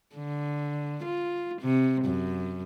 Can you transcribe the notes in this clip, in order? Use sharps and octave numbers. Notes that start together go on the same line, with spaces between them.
D3
F4
C3
F#2